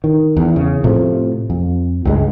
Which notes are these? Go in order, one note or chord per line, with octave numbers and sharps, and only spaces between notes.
D#3
E2
C#3
A2 C3 F3 A3
F2
C#2 G2 G#3